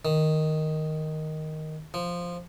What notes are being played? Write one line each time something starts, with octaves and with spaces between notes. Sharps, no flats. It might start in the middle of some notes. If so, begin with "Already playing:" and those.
D#3
F3